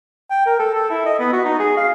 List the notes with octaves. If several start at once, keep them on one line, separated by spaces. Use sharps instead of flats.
G5
A#4
A4
A4
E4
D#5
B3
F#4
D#4
G#4
F5